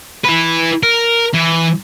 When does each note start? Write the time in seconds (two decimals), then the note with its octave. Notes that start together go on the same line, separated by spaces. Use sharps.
0.25 E4 B4
0.83 A#4
1.34 E3